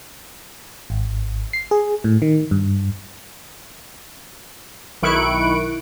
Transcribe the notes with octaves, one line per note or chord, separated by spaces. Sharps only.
G#1
C7
G#4
A2
D#3
G2
B1 D#3 E4 C#6 F#6 D7